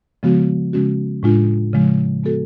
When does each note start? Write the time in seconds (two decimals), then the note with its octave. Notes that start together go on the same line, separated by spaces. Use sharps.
0.23 C#3 F3 G#3 B3 F#4
0.73 C#3 G#3 C#4 F#4
1.23 A2 G#3 D4 F4
1.73 C#3 F3 G#3
2.23 G#3 B3 F#4 A4